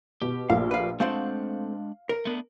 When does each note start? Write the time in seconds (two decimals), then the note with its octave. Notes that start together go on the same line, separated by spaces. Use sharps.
0.22 B2 G4
0.50 A#1 A3 A#3 F5
0.71 B4 F5
1.00 G#3 A3 C4 D4 C5 F5 F#5
2.09 A#4
2.25 A3 B3 D4